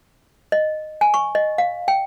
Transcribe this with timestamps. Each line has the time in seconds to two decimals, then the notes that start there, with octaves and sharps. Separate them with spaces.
0.52 D#5
1.01 G#5
1.14 C#6
1.35 D#5
1.58 F5
1.88 G5